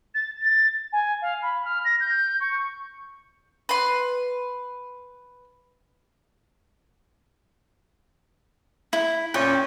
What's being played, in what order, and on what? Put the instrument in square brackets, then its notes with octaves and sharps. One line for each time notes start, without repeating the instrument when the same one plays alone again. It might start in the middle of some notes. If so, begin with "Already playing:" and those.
[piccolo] A6
A6
G#5
F5
B5
F6
A#6
G6
C#6
[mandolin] B4 C6
[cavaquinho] E4
[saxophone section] A#2 C#4 [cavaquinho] G5